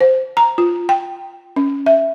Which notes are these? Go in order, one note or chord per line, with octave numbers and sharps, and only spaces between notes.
C5
A#5
F4
G5
C#4
E5